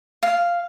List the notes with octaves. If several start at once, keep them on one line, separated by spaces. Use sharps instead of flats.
F5